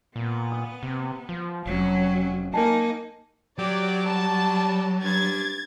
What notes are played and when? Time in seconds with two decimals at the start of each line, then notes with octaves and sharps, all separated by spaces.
0.16 A#2 B3
0.52 D#6
0.83 C3
1.29 F3
1.66 F1 F#3 C#4
2.53 A#3 D#4 A#4 G#5 A5
3.58 F#3 G4 D5
4.06 G3 A5
5.03 G2 G#6 A6